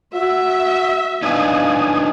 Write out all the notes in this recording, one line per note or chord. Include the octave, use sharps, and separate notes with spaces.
F#4 E5
B3 D4 D#4 F5 G#5 D#6